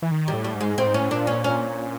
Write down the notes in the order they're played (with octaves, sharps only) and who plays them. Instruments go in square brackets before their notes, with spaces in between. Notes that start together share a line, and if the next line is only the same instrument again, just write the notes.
[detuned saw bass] E3
D#3
[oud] G3
[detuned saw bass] A2
[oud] G3
[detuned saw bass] G#2
[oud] G#3
[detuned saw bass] A2 [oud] C4
[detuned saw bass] G#2
[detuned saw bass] A2 [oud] C#4
[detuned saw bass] A#2 [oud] D4
[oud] C#4
C#4